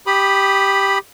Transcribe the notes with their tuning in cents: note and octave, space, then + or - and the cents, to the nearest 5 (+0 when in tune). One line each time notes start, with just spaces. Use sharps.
G4 +0 B5 +0 D#6 -20